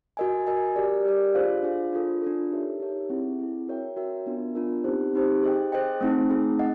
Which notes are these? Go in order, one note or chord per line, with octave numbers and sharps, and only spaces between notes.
F#4 A#4 D#5 G#5
F#4 A#4 D#5 G#5
G4 A#4 D5
G4 A#4 D5
D4 F4 G#4 C5 F5
D4 F4 G#4 C5 F5
D4 F4 A4
D4 F4 A4
D#4 G4 A#4 C#5 E5
D#4 G4 A#4 C#5 E5
C4 E4 G#4
C4 E4 G#4
F#4 A#4 C#5 E5 G5
F#4 A#4 C#5 E5 G5
B3 D4 F4 A#4
B3 D4 F4 A#4
C4 D#4 G4 C5
C4 D#4 G4 C5
G#4 C5 D#5 G5
G#4 C5 D#5 G5
A3 C4 D#4 G#4
A3 C4 D#4 G#4
D#5 F#5